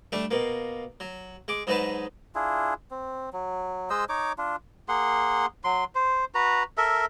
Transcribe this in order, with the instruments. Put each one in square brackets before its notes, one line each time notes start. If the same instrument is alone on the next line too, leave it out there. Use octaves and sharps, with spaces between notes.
[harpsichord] G3 A3 D4
B2 A#3
F#3
G#3 D6
G#2 F#3 G#3 D#4 B4 A5
[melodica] D4 E4 F4 G#4
C4
F#3
G#3 C5 D#5 E6
D#4 C#5 D6
D4 F4
A#3 G#4 F#5 C6
F#3 C6
C5
F#4 B4 A#5
A4 A#4 E5